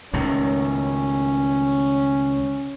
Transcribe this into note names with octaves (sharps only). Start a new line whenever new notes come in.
C#2 A2 D#3 C#4